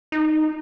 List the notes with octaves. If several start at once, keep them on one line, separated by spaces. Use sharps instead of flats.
D#4